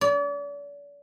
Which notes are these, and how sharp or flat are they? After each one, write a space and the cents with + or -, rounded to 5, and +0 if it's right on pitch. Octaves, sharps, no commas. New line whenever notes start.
D5 -40